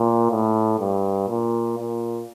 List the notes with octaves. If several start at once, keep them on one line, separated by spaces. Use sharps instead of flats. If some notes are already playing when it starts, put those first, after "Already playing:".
Already playing: A#2
A2
G2
A#2
A#2